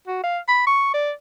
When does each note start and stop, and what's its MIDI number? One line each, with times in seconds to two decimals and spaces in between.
0.08 0.20 66
0.24 0.39 77
0.48 0.63 83
0.67 0.92 85
0.94 1.11 74